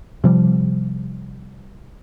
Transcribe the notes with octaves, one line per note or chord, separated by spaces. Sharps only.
C3 F3 G3